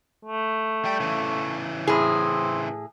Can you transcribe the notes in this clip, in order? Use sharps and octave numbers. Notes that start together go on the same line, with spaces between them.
A3
G3 G5
C#3 E3
A2 C4 G#4